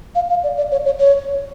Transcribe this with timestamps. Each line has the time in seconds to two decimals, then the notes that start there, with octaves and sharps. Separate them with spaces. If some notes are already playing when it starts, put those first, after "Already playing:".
0.15 F5
0.29 F5
0.43 D5
0.57 D5
0.71 C#5
0.85 C#5
0.99 C#5